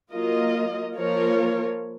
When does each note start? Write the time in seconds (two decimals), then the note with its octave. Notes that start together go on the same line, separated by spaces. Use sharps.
0.12 F#3 A#3 F4 A#4 D#5
0.95 F3 A#3 F4 A#4 C#5